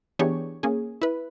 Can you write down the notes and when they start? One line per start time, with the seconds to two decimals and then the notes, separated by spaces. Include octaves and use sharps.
0.19 E3 B3 D4 G4 G#4 C#5
0.63 A#3 C#4 G#4
1.02 E4 B4